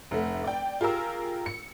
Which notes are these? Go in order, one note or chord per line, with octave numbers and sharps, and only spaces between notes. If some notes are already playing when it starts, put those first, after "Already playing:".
F1 A3
D5 G5
F4 G4 G#4 A#4 E6
C#7